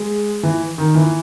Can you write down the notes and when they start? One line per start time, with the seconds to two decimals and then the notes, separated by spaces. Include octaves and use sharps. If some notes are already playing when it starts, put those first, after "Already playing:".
Already playing: G#3
0.43 E3
0.78 D#3
0.95 E3